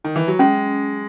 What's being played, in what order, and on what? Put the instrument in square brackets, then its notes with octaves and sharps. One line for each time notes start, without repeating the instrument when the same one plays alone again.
[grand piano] D#3
E3
F#3
[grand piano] G#3 [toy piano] C#4